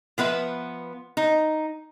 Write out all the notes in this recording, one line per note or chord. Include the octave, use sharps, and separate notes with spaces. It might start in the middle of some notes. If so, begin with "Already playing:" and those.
F3 B3 B4 E5
D#4